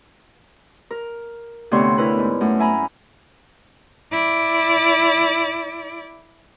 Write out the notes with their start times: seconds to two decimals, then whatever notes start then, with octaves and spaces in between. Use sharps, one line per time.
0.91 A#4
1.71 D2 C3 B3 C#5 C6
1.98 E4 A#4 B4
2.18 G#2
2.41 F#2 A3
2.59 E5 G#5 A#5 B5
4.12 E4 D5